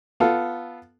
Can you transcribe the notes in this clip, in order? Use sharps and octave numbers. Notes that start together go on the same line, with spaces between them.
B3 F4 A4